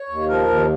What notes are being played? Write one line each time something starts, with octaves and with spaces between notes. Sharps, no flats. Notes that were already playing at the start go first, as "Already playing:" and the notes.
Already playing: C#5
D#2
F3 A#4
D#2